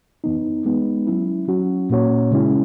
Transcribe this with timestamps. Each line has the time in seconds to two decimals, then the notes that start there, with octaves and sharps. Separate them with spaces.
0.24 F#2 E3 B3 D#4
0.65 G#3 B3 D#4
1.07 F#3 C#4 E4
1.48 F#3 C#4 F#4
1.90 A#2 A#3 C#4 F#4 C#5
2.31 C#3 G#3 C#4 E4